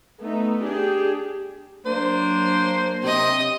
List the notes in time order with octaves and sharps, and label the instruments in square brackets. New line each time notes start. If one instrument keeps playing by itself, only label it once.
[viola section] A3 B3 D#4
D4 G4 G#4
[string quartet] F#3 D4 [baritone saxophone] A#3 [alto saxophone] C5
[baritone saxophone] C3 [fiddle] D#5 C6